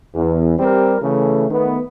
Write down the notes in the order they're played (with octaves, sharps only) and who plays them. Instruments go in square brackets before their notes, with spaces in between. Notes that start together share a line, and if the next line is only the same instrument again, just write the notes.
[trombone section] E2
G3 C4 G4 A#4
C#3 E3 A3
D#3 A3 B3